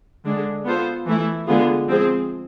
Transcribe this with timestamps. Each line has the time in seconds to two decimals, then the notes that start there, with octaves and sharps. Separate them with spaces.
0.25 D3 G#3 D4 G#4
0.65 B3 F4 A4 C5
1.06 E3 A3 E4
1.47 D3 G#3 B3 F4 G#4
1.87 F3 G#3 C4 G#4